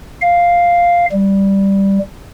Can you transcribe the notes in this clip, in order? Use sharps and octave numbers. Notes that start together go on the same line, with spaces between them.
F5
G3